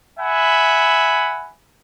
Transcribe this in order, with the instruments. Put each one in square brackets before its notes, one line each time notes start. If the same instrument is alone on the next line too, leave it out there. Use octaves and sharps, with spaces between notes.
[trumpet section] E5 F#5 G#5 B5